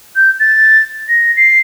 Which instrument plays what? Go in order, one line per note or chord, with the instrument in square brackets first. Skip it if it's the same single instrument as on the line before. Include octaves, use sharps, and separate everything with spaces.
[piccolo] G6
A6
A#6
C7